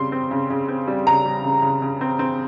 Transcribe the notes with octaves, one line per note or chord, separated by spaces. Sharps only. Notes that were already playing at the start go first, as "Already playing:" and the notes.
Already playing: C#3 G3 C4 C6
C4
C#3
C#3
C4
G3
C#3 A#5
G3
C#3
C#3
C#3
C4
C4